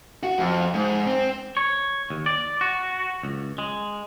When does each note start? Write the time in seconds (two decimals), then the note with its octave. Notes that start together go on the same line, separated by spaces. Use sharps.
0.23 F#4
0.38 F2
0.74 G#2
1.06 C4
1.57 C#5
2.10 D#2
2.26 D5
2.61 F#4
3.23 C#2
3.58 G#3